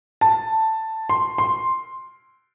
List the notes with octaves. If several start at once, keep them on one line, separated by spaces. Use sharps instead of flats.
A5
C6
C6